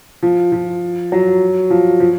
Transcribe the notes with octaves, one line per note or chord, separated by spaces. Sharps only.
F3
F3
F#3
F3
F3